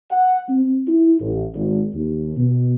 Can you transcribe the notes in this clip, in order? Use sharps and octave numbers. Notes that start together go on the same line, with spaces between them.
F#5
C4
E4
A1
G#1
D#2
B2